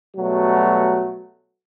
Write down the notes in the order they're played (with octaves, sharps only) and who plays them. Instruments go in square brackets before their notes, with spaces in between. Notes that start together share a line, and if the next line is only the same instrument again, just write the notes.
[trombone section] B2 F#3 G3 A3